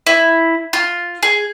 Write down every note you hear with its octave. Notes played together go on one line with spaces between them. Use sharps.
E4
F4
G#4